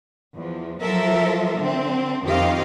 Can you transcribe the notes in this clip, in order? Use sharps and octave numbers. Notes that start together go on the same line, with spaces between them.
E2 F3
F3 F#3 A4 A#4 E5
D3 C4
F2 D#3 C4 G4 D#5 F5